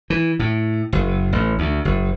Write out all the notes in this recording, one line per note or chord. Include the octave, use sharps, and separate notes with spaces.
E3
A2
F#1
A1
D2
F#1